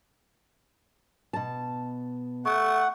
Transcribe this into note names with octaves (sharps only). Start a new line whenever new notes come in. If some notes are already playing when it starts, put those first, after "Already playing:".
B2 A5
A3 F#5 C#6